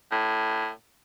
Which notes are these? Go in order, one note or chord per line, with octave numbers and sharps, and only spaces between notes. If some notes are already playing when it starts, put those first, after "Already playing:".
A2